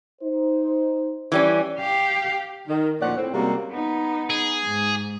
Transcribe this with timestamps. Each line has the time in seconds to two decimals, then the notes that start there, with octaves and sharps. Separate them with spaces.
0.22 D#4 C5
1.32 E3 G3 C#4
1.78 G4 F5
2.68 D#3
3.01 D2 A#2 F3 C#4 D5 F#5
3.17 A2 C4
3.34 C3 G3 G#3 A#3 C#4 F#4
3.71 B3 D#4
4.30 G#4
4.64 G#2